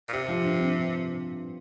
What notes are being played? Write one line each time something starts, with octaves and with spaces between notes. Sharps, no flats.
A#2
C3 G4
F3
G2
C4